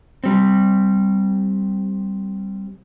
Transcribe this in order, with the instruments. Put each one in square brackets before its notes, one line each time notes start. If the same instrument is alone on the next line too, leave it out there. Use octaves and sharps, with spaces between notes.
[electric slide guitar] G3 C4